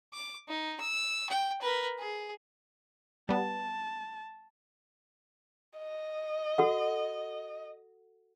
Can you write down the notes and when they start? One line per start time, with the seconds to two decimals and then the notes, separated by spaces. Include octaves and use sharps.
0.14 D6
0.48 D#4
0.80 E6
1.29 G5
1.61 A#4 B4
1.99 G#4
3.29 G3 B3 A5
5.78 D#5
6.58 F#4 A4 F#5